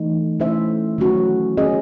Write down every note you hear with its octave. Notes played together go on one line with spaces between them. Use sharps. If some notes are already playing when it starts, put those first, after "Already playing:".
Already playing: E3 A3 D#4
A3 C#4 E4 C5 E5
D#3 F#3 A3 C#4 F#4
C#4 G#4 D#5